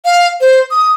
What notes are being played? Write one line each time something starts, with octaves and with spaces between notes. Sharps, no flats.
F5
C5
D#6